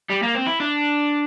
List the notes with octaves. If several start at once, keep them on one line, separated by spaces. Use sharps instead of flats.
G3
A#3
C4
E4
D4